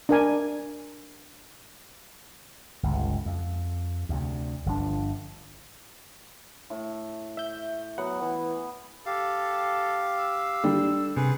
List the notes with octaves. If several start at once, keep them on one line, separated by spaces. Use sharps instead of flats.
D4 A#4 G#5
G1 C#2 D3
F2
D2 C3
G1 F3 D4
A2
E5 G6
F#3 B3 F#5
E3
G4 A4 F5
E6
D3 G3
C3 G#4 B4